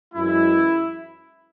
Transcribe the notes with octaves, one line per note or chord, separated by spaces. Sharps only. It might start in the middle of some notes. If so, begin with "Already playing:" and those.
F#2 E3 G#3 E4